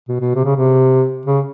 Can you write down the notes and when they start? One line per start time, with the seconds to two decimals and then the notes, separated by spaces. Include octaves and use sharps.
0.08 B2
0.21 B2
0.35 C3
0.45 C#3
0.56 C3
1.26 C#3